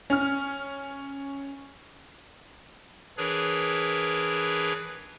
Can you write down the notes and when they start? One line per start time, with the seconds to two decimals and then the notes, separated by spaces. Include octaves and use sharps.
0.10 C#4 F6
3.17 E3 D4 G#4 A#4 B4 C#5